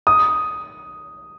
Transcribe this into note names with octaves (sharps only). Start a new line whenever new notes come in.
D#6